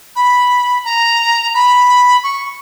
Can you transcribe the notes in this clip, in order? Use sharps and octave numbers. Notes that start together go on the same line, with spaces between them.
B5
A#5
B5
C#6